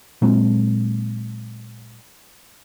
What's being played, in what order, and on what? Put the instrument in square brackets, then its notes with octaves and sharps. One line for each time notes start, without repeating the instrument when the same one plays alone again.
[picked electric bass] A#2 F#3 G#3 C4